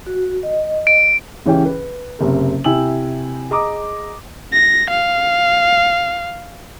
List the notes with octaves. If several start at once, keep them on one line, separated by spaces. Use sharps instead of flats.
F#4
D#5
D7
C#2 E3 C#4 G4 G5
B4
F#1 C3 A#4
C3 E4 G5 G#5 E6 F#7
G#4 D#5 A#5 D6 D#6
A#6
F5